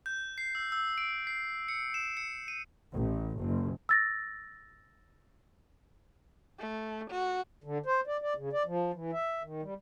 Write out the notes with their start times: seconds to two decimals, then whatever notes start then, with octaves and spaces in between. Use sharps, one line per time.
0.06 G6
0.38 C7
0.55 E6
0.72 E6
0.98 D7
1.27 C7
1.68 C#7
1.94 E7
2.17 C#7
2.48 D#7
2.92 A1
3.39 F#1
3.89 E6 A6 A#6
6.59 A3
7.10 F#4
7.64 D3
7.86 C5
8.07 D5
8.22 D5
8.36 C#3
8.53 D5
8.66 F3
8.93 E3
9.13 E5
9.43 D#3
9.62 G3